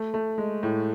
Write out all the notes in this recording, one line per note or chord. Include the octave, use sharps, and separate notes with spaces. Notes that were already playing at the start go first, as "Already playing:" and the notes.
Already playing: A3
A3
G#3
A2